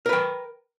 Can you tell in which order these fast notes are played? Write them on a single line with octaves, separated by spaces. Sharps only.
A#4 B4 G5